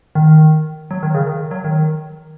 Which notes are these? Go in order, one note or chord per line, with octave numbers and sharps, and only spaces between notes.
D#3
F#3
D#3
C#3
D#3
F#3
D#3